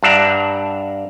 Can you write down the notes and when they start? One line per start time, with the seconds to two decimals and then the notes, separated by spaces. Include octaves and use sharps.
0.03 G2 D4 E5 F#5 A#5